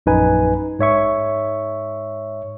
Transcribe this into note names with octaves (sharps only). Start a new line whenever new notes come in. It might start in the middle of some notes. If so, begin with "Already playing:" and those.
A#1 F#2 D#4 B4 G#5
G#2 C#5 E5 C#6